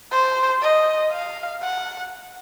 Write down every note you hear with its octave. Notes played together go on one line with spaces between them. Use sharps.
C5
D#5
F5
F#5